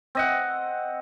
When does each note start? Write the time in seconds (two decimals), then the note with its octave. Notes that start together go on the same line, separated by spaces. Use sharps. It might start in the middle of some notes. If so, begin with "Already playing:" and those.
0.15 C4 D#5 F#5